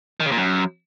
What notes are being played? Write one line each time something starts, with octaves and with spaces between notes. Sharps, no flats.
D#3
C#3
A#2
F#2